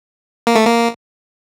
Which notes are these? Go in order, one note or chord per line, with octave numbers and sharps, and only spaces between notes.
A#3
A3
A#3